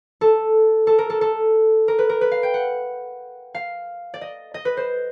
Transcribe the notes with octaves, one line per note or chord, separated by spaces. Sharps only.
A4
A4
A#4
A4
A4
A#4
B4
A#4
B4
F5
G5
F#5
F5
D5
D#5
D#5
B4
C5